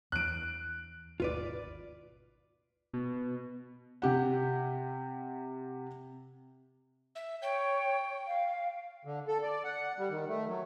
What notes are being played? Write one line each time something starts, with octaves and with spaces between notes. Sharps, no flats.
E2 E3 F#6 D7
G#1 D#2 B2 F4 B4 D5
B2
C3 G4 F#5
E5
C#5 G5
F5
D3
A4
D5
F#5
G3
D#3
A3
F#3